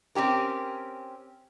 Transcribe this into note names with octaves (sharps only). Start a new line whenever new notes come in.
C4 C#4 G4 A#4